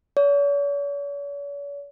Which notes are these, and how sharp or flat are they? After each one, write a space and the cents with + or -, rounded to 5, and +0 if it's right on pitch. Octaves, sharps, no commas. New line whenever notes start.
C#5 +45